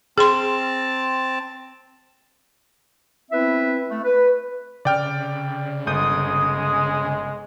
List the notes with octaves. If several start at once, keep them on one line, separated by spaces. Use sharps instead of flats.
C4 G#4 A5 C6
B3 C4 E4 B4 E5
A3
B4
C#3 D5 G5 F6
G1 G#3 D#6 G6